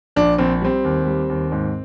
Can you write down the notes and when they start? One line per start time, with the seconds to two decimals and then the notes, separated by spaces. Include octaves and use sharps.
0.16 A#1 D4
0.38 A#1 C4
0.61 G3 C4
0.84 D#2
1.07 G3
1.29 D#2
1.52 G#2